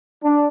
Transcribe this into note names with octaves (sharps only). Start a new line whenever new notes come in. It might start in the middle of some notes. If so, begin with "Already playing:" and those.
D4